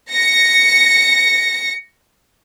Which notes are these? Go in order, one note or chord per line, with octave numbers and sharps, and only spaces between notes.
A#6 C#7